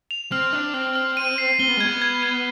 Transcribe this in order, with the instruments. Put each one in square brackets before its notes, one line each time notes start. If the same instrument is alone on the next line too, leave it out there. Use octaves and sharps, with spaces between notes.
[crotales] F7
[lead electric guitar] C4 [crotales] F6
[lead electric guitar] D4 [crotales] F6
[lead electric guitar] C4 [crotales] F6
[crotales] F6
D#7
C7
[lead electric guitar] C4 [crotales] G7
[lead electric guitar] B3
G#3
[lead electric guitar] B3 [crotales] G#6
[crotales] G#6
G#6